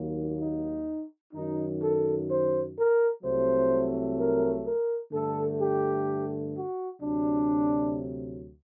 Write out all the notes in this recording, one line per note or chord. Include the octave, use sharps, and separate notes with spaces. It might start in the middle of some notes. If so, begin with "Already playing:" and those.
Already playing: D#2 D#3 F#3 A#3
D#4
F#2 D#3 F#3 D#4
A4
C5
A#4
C2 C3 F#3 A3 C5
A#4
A#4
G2 D3 A3 A4
G4
F#4
D2 C3 F#3 D4